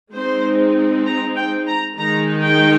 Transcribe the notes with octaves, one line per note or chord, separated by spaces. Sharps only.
G#3 C4 D#4 C5
A#5
G5
A#5
D#3 G#3 D#4 A#5
G5